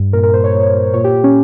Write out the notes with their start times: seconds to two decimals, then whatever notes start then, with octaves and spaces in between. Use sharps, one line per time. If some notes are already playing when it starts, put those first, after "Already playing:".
Already playing: G2
0.13 A#2 A#4
0.23 A#4
0.33 A#2 C5
0.44 C#5
0.54 A#2
0.74 A#2
0.94 A#2 C#5
1.04 G4
1.14 A#2
1.24 C#4